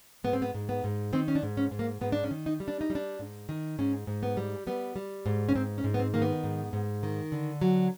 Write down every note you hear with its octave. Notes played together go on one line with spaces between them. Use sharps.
G#2 B3
C4
B3
G#2
B3
G#2
D#3 C4
C#4
D4
G#2
C#4
G#2
A#3
G#2 B3
D4
C#4
D#3
D#4
G3
D4
D#4
G3
D4
G#2
D#3
G#2 C#4
G#2
B3
G3
G3 B3
G3
G#2
C#4
G#2 C4
C#4
G#2
B3
C4
D#3 A#3
B3
G#2
G#2
D#3
D3
F#3